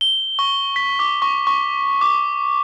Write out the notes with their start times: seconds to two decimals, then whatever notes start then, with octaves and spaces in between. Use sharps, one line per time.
0.01 G7
0.39 C#6
0.76 B6
0.99 D6
1.22 C#6
1.47 C#6
2.01 D6